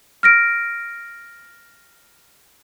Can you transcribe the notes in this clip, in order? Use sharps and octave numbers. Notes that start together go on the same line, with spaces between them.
F6 A#6 D7